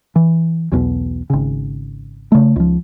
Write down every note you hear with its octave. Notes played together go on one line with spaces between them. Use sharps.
E3
B1 E2 B2
G#1 C#3
C#3 A3
C#2 F3